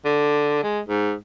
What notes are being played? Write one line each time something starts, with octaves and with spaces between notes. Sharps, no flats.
D3
G#3
G#2